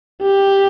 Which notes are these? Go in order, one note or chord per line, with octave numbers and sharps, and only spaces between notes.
G4